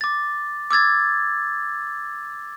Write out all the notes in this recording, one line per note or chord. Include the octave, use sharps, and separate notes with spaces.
D6 A6
D6 E6 G#6 A6